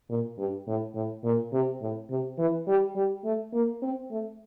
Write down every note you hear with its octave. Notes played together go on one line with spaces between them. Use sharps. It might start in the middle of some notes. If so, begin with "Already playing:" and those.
A#2
G2
A2
A2
A#2
C3
A2
C3
E3
G3
G3
A3
A#3
C4
A3